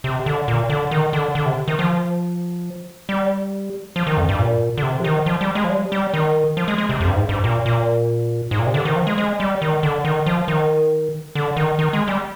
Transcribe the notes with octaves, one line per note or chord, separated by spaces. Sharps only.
C3
D3
A#2
D3
D#3
D3
D3
C3
D#3
F3
G3
F3
D#3
F2
G2
A#2
D3
C3
F3
D#3
F3
G3
G#3
F3
G3
G3
D#3
F3
G#3
G#3
C3
F2
G2
G#2
G2
A#2
A#2
G#2
A#2
C3
D3
D#3
F3
G#3
G#3
G3
D#3
D3
D#3
F3
D#3
D3
D#3
D#3
G#3
G3